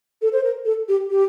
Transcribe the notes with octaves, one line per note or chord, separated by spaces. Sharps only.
A4
C5
A#4
A4
G4
G4